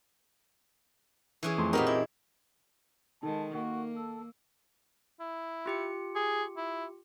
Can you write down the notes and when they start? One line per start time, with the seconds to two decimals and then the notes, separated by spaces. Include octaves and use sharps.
1.43 E3 C#4 G#4
1.58 F2 A3 C6
1.73 A#2 B3 C4 D#4 G4 A#4
1.87 E4
3.23 D#3 G#3 D#4 A4 A5
3.54 A#3 F#4
3.97 A4 E6
5.20 E4
5.66 F4 G4 C#7
6.16 G#4
6.57 E4